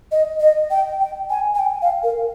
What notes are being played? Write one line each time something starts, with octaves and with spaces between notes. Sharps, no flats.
D#5
D#5
G5
G5
G#5
G#5
G5
F5
A#4